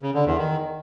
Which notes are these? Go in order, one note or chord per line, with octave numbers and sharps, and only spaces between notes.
C#3
D3
E2
D#3